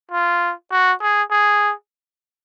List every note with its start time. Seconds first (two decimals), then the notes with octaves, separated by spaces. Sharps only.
0.11 F4
0.72 F#4
1.02 G#4
1.31 G#4